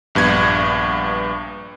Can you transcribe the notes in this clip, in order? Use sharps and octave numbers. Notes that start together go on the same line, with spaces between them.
A#1 G2 B3 G#6